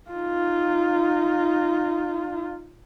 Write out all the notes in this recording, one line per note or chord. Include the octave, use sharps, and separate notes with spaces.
D#4 F4